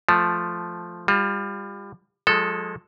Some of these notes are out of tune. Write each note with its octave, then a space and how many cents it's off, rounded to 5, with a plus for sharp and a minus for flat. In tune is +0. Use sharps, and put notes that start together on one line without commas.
F3 +0 A3 +0
G3 +30 F4 +25
F3 +45 G#3 +0 A4 +0